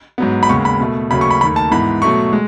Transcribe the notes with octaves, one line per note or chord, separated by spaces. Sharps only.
G#2 F#3 B3
B5
D#2 C#3 G#3 B3 C#6
B5
B2 A3
D#2 C#3 F#3 A3 B5
C#6
B5
D#2 D#3 A3 B5
A5
G#2 E3 B3 B5
B2 F#3 A3 C#6
G#3